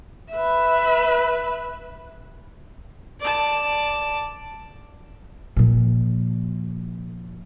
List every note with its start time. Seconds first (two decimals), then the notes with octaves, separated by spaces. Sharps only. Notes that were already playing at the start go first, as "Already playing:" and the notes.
0.31 B4 E5
3.20 D5 A5
5.57 A#2 F3